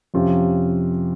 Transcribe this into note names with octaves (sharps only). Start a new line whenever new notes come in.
F2 C3 F3 C#4 F4